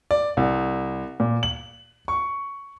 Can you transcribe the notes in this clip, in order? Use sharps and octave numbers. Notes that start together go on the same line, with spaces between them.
D5
C2
A#2
F#7
C#6